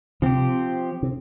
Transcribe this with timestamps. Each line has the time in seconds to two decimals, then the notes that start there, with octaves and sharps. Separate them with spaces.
0.22 C3 F3 C4 G4
1.03 C3